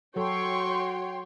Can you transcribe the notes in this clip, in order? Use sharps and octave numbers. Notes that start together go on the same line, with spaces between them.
F#3 F#4 A4 C#5 G5 C6 C#6